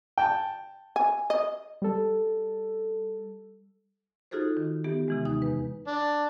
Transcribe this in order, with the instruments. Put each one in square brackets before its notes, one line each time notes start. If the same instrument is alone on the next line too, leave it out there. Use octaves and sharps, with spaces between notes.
[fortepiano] G5 A5
[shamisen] G#5
D#5
[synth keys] G3 A4
[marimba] D#4 F4 F#4 G#4 A4 C5
D#3
E3 B3 G4
C3 E3 G#3
D#2 D#4 D#6
E2 B4
[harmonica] D4